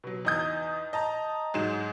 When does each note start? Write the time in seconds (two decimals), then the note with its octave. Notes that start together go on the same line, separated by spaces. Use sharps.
0.04 B2 F#3
0.25 E2 D#4 D#5 D#6 G6
0.93 D#5 A5 A#5
1.54 G#2 F#3 G#3 E7